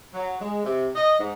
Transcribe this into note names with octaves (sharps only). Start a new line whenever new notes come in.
F#3
G#3
C3
D#5
G#2